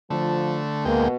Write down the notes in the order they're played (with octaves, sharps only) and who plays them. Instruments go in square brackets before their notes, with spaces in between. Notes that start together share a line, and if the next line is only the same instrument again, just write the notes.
[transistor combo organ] D3 A3 [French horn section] F3
[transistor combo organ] D2 G#3 G5 [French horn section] B2 B3 F#4 [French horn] A#3